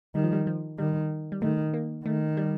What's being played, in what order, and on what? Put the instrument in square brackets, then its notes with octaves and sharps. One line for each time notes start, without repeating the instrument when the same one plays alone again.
[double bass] D#3 [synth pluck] G3
[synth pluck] F3
G3
F3
[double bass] D#3 [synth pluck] G3
[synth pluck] G3
[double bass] D#3 [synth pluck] A3
[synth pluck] A#3
[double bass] D#3 [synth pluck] A3
[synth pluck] G3